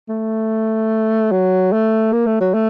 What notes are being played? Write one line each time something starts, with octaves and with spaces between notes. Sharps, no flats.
A3
F#3
A3
A#3
A3
F#3
A3